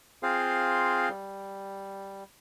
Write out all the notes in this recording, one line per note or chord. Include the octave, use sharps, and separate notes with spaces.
C4 F4 G#4 C5 F5
G3